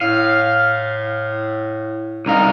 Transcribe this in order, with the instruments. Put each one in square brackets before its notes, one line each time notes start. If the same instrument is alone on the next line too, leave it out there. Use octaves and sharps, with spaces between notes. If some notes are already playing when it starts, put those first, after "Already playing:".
[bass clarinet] A2 [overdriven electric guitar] F5
[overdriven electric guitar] C2 F5 [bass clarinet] D#4